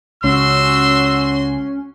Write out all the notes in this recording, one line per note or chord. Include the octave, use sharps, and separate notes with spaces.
C#2 C#4 F#4 C6 E6